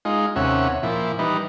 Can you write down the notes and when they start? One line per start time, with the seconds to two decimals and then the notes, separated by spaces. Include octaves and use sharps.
0.05 G#3 D#4 F4
0.36 D#2 C3 C#4 E5 F#5
0.83 A#2 F3 E4
1.19 E3 G3 D#4 B4